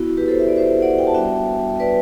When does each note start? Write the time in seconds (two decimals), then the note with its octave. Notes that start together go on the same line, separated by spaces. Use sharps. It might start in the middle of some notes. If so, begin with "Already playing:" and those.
Already playing: B3 E4 F#4
0.17 G4 B4
0.28 A4 C5
0.39 E5
0.48 D5
0.58 C5 E5
0.82 D5 F#5
0.98 G5
1.07 A5
1.14 G3 B3 D4 F#4 E5 G5
1.80 B4 D5